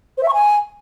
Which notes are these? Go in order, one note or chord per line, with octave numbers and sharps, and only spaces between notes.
C5
E5
C#6
G#5